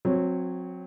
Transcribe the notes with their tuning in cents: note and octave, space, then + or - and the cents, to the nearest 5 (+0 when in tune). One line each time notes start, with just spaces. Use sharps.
F#3 -30 C4 +0 C#5 +0